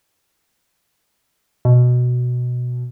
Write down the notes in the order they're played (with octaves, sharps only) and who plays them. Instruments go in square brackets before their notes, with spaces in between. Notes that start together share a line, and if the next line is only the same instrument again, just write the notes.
[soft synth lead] B2